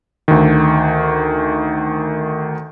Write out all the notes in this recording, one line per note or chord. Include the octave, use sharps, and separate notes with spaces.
D2 D#3